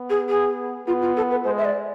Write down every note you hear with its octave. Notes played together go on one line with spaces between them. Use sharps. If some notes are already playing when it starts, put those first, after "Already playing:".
Already playing: B3
G#4
G#4
B3 F4
F4
A4
B4
G#3 C5
E5
D5